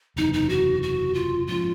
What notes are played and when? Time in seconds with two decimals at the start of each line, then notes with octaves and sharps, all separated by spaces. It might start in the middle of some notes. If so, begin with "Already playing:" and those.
0.16 F#1 E2 C3 E3 D#4
0.34 D#4
0.49 F#4
0.83 F#4
1.14 F4
1.47 G#2 F3 A#3 C#4 F4